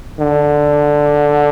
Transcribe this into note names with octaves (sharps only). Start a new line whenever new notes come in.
D3